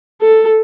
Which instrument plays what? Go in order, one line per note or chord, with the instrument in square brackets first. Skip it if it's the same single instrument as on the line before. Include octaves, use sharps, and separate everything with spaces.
[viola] A4